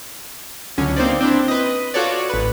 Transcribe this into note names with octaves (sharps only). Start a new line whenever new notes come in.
C#2 D3 F#3 C#4
A#3 C4 D#4 C5 D5
C4 D4 E4
B4 D#5
F4 F#4 A4 C#5 D5
A1 B4